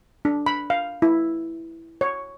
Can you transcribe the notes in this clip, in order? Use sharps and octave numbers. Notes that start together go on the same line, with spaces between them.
D4
B5
F5
E4
C#5